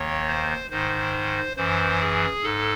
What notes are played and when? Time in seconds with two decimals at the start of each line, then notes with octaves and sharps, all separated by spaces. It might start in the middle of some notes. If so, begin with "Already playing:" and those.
Already playing: D#2 D#3 C#5
0.28 C5
0.71 G#2 D#3 C5
1.57 F#2 E3 C5
2.00 G#4
2.43 G#2 A4